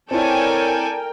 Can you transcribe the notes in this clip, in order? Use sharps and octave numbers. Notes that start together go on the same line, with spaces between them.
C4 E4 A4 A#4 C#5 D5 G5 G#5